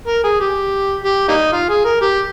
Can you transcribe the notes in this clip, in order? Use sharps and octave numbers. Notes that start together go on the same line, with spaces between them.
A#4
G#4
G4
G4
G3 A#3 D#4
F4
G#4
A#4
G4